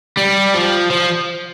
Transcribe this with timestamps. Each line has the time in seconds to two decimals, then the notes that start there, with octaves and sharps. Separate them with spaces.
0.17 G3
0.54 F3
0.91 F3